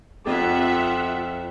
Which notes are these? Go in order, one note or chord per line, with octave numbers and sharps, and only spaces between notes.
F2 F4 A4 E5 F#5 D6